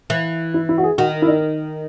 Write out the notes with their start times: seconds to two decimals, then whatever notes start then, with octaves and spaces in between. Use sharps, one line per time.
0.10 E3
0.54 E4
0.69 E4
0.78 F#4
0.83 G#4
0.98 D#3 F#4
1.22 E4
1.27 D#4